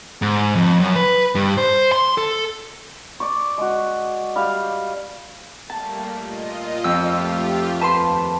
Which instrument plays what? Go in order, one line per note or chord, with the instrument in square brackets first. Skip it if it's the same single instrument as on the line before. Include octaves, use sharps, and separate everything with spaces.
[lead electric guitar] G#2
F2
F#2
B4
G2
C5
C6
A4
[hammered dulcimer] D5 C#6
G#3 F#4
G3 F5
[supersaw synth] G3 A3 A#3 [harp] A5
[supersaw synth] A#2 F4 D#5
[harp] F2 [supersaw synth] A3 F4 G4 [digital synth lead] E6
[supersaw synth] D#2 [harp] B4 C6 [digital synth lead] A5